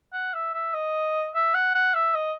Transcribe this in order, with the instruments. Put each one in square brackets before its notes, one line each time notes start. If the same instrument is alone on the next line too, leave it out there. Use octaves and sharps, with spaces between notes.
[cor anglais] F#5
E5
E5
D#5
E5
F#5
F#5
E5
D#5